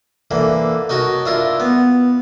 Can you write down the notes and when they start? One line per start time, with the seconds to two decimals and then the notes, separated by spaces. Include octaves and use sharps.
0.31 D3 E3 A#3
0.89 D#4 F#4 A#4 C#5 A5
1.26 D4 E4 F4 A#4
1.60 B3